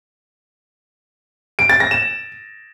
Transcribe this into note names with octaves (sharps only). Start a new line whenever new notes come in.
D7
A6
A#6
E7